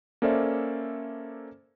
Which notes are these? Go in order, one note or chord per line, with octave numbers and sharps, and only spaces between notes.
A#3 C#4 A4 C5 D5 E5